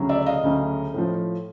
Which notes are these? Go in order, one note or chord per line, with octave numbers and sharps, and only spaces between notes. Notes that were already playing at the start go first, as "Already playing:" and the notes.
Already playing: D2 C#3 F#3
D5 E5
D#5 F5
D2 C#3 F#3
A2 F3